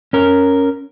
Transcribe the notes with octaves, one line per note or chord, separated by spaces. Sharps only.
C#4 A#4